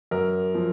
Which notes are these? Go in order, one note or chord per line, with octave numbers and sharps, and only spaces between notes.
F#2 A#4
F3